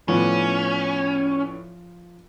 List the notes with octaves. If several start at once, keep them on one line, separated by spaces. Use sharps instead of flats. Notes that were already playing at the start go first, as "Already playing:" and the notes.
A2 F3 B3 C#4 D4